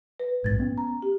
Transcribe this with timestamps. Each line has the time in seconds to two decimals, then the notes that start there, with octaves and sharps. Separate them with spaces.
0.20 B4
0.44 A#1 G#2 G#6 A6
0.59 B3 C#4
0.78 A#5
1.02 G4